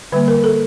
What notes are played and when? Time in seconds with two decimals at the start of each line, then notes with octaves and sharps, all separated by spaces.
0.12 D3 G3 A#3 B4
0.28 A#4
0.44 A4